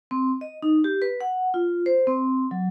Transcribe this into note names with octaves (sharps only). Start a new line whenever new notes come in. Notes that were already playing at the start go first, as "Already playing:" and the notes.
C4
D#5
D#4
G4
B4
F#5
F4
C5
C4
F#3